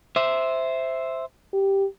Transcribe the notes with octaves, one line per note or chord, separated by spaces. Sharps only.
C5 E5
G4